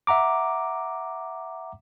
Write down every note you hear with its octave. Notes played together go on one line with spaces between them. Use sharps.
E5 F#5 A#5 D6